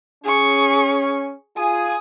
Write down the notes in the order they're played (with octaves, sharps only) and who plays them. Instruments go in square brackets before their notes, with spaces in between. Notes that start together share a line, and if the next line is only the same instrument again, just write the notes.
[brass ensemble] C#4 [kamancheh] G#4 C#6
[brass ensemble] F4 G#4 G#5 [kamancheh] D#6